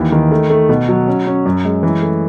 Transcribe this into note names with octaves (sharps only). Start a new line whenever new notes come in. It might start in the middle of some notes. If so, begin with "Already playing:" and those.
Already playing: D#2 E3
D#3
A3
A3
B2
F#3
C#4
C#4
F#2
G#3
E3
A3